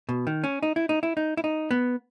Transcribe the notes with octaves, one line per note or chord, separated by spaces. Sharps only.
B2
D#3
C#4
D#4
E4
D#4
E4
D#4
E4
D#4
B3